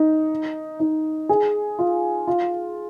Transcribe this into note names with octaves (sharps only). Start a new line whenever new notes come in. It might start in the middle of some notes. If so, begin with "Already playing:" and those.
Already playing: D#4
D#4
G#4
F4
F4